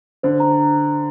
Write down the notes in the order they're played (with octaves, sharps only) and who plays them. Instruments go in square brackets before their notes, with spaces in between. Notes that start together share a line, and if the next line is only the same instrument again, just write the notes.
[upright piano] D3 [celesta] C5
[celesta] A#5